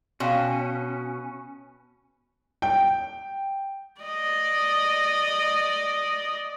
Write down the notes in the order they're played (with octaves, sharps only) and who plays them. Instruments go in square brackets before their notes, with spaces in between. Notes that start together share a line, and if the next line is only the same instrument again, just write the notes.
[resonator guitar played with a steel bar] B2 [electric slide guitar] C#4 [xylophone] F5 G5 C6
[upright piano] G5
[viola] D5 D#5